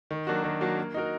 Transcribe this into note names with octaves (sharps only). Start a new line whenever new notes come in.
D#3
F#3 A#3 D4 F#4
D#3
F#3 A#3 D4 F#4
A#3
D#4 F#4 A#4